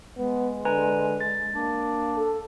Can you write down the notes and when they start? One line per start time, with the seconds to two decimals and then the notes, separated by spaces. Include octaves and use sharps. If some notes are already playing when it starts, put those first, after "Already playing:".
0.18 G#3 B3
0.65 D3 B4 G#5 A#5
1.20 A6
1.54 A#3 D4
2.17 A4